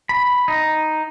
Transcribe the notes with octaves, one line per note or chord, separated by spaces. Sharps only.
B5
D#4